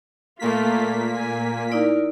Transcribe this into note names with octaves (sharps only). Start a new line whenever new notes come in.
A#2 A3 A#3 F4 B6
G#5
D#4 E4 A#4 D5